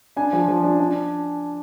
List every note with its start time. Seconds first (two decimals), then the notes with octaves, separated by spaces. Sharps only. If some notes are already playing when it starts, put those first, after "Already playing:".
0.16 D4 G#5
0.33 F3
0.48 F3
0.64 D4
0.79 D4